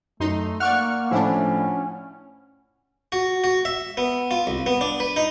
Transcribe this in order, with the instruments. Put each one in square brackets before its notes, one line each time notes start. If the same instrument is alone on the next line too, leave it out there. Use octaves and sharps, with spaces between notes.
[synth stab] F#2 D#4 C6 [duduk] A3
[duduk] A#3 [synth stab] D5 C#6 F6 [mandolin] F#5
[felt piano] A2 F3 [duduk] C#4 [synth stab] D4 E4
[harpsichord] F#4
F#4
E5
B3
F4
C2
B3
D4
B4
D#4